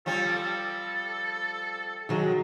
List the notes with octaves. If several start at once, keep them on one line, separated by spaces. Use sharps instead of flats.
F3 G3 C4 A4
A4
D#3 F#3 G#3 F#4